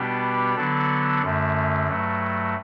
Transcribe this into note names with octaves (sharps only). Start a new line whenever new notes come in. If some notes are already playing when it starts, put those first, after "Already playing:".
Already playing: B2 G3 B3 D4 G4
D3 F#3 B3 D4 A4
F#2 D3 A3
G2 F#3 A3